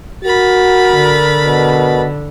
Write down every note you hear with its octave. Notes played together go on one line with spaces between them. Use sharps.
F#4 A#4 B5 A6
D3
B2